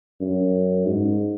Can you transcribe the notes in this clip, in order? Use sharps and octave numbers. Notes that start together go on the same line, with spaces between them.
F#2
G#2